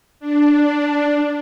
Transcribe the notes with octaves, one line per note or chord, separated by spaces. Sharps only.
D4